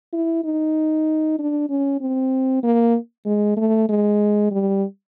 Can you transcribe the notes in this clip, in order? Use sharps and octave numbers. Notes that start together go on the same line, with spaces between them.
E4
D#4
D4
C#4
C4
A#3
G#3
A3
G#3
G3